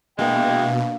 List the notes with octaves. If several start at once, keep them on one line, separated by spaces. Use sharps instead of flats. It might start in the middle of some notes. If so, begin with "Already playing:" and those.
B2 E3 G#3 A#3 D4 F5 G5